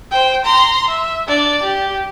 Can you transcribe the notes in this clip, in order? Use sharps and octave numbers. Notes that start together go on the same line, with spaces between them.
C5 G5
A#5 C6
E5
D4 D5
G4